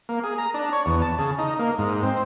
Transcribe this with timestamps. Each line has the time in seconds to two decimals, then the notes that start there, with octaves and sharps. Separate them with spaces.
0.09 A#3
0.24 G#4
0.38 A#5
0.54 D4
0.73 C#5
0.86 E2
1.02 A5
1.18 C#3
1.38 D#4
1.59 A#3
1.78 G#2
2.03 C4